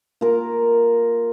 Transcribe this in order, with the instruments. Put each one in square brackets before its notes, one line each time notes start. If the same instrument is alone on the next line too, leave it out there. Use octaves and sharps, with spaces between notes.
[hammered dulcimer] A#3 F4 A#4